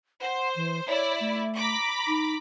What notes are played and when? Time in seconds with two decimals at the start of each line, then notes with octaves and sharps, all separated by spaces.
0.22 C5 F#5
0.56 E3
0.88 E4 C#5 D5
1.21 A3
1.56 A#5 B5 D6
2.08 D#4